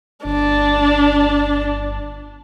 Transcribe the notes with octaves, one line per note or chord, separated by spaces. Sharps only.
G1 D4